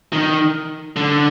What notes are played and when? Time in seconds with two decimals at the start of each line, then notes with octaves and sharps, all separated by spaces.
0.13 D#3
0.96 D3